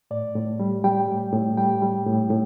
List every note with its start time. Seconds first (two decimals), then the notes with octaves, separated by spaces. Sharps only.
0.11 A2 D5
0.35 A2
0.60 G3
0.84 G3 G5
1.08 A2
1.33 A2
1.57 G3 G5
1.82 G3
2.06 A2
2.30 A2